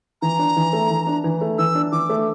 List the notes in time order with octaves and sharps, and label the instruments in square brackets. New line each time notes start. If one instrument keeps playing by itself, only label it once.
[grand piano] E3 [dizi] A#5
[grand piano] D4
E3
A3
E3
D4
E3
A3
[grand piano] E3 [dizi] E6
[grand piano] D4
[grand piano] E3 [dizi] D6
[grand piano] A3